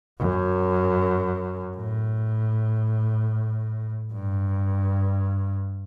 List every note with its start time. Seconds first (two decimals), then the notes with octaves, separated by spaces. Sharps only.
0.19 F#2
1.77 A2
4.13 G2